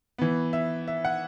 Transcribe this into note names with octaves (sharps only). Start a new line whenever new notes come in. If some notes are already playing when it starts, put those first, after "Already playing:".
E3 B3
E5
E5
F#5